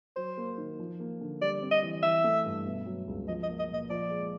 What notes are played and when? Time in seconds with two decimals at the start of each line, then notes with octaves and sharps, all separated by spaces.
0.16 F#3 C5
0.37 A#3
0.58 D#3
0.79 F3
1.00 A#3
1.21 D3
1.41 G3 D5
1.61 C4
1.72 D#5
1.83 E3
2.03 E3 E5
2.24 A3
2.45 G2
2.66 B2
2.86 F#3
3.07 C#2
3.28 F3 D#5
3.43 D#5
3.48 A#3
3.59 D#5
3.69 A#2
3.74 D#5
3.90 F3 D5
4.11 G#3